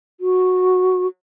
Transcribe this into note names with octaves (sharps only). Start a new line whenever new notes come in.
F#4